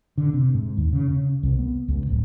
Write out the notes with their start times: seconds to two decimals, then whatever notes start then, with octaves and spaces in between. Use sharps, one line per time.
0.18 D3
0.33 C3
0.54 G#2
0.77 D#2
0.93 C#3
1.11 C#3
1.43 C2
1.59 B3
1.88 C#2
2.07 D1